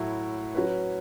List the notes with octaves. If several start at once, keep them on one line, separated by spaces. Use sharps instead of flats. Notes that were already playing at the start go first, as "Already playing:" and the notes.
Already playing: A2 F#3 A3 E4
F#3 C#4 F#4 B4